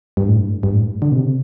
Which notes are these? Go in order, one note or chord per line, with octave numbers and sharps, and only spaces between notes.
G2
A2
G2
G2
A2
D3
B2
C3